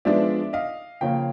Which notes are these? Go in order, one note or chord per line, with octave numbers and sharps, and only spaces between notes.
F3 G#3 B3 D4 D5 E5
D#5 F5
C#3 F3 A#3 C#4 F5 G5